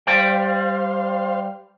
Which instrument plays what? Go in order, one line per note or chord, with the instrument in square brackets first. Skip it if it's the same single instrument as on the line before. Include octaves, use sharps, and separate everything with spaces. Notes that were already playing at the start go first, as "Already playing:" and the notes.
[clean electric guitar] G3 G5 [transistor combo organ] C5 F5